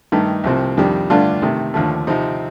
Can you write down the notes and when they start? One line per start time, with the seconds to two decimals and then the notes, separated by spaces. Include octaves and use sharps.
0.12 G2 D#3 A3 D#4
0.44 C2 C3 F3 C4
0.77 F2 D#3 G3 D4
1.10 G2 D3 A3 D4 F4
1.42 C3 D#3 A3
1.74 D#2 D3 F3 A3
2.07 C3 F3 C4 D#4